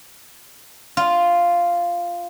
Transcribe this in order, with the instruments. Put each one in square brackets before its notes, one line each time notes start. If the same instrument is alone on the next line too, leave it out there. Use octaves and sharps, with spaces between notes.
[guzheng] F4